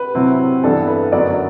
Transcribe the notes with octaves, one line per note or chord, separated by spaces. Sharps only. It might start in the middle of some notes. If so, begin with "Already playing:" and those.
Already playing: B4
C3 F#3 C4 E4
G2 E3 B3 D4 A4
B4
F#2 D3 F#3 B3 D5